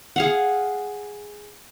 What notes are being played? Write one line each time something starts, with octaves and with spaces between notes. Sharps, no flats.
G#4 F5 F#5